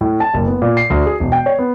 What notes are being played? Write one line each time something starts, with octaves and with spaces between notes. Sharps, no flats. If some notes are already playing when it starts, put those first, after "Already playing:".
A2
A5
F#1
B3
A#2
C7
D2
G#4
E1
G5
C#5
B3